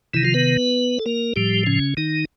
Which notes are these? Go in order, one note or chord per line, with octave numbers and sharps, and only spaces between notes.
C3 D#3 E3 E4
F3 F4
B3 B4
A4
A#3 A#4
A2 F3 G3 G4
C#3 C#4
D#3 D#4